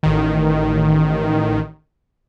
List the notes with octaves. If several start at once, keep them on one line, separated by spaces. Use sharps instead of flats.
A1 D#3